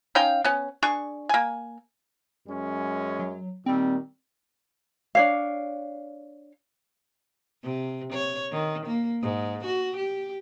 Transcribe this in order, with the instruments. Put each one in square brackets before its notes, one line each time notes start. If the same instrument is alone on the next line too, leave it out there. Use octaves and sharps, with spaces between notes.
[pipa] C#4 D#4 F5 G5
B3 C#4
D4 G#4 C#6
A#3 G#5
[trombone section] F#2 G#3 C#4
[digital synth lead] F#3
[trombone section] A#2 D#3 G3 [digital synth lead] C4
[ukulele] D4 C#5 F5
[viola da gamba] C3
C#5
D#3
A#3
G#2
F#4
G4